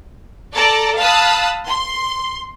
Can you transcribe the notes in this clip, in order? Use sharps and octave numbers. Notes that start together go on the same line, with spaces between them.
A4 D5 A5 A#5
F5 A5 B5 D#6 E6 F#6
C6